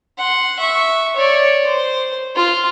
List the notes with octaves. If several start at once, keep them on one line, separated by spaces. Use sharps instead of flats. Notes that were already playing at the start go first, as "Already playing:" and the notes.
F#5 C6
E5 C#6
C#5 D5
C5
F4